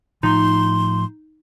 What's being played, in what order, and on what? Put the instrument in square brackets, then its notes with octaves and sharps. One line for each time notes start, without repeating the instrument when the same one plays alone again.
[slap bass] A2 F3 [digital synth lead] D#4 [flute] C6